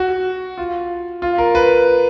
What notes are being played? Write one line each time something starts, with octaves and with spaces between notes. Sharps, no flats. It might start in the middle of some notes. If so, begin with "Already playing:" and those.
Already playing: F#4
F4
F4
A#4
B4